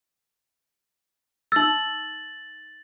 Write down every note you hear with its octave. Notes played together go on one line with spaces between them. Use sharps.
D#4 E6 A6 F#7